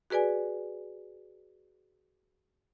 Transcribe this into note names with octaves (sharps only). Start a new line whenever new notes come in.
F#4 G#4 B4 D5 G#5